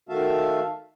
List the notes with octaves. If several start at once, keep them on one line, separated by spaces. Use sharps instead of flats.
D#3 A3 F#4 E5 F5 A5